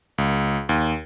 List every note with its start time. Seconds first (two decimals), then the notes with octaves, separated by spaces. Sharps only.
0.18 C#2
0.69 D#2